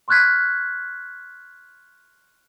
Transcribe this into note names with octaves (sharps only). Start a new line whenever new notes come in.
C6 C#6 F6 F#6 G#6 B6